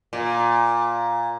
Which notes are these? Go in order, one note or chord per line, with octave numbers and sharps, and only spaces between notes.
A#2